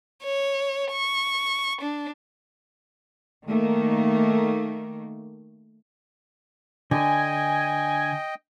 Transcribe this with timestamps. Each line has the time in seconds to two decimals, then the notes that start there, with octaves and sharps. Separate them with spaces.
0.23 C#5
0.92 C#6
1.81 D4
3.45 D#3 A3 A#3
6.91 D3 D#5 G5 G#5